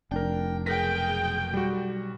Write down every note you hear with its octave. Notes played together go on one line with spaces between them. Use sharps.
F1 D4 A#4 G5
B1 G#4 A#4 B4 G5 A#6 B6
G3 F#4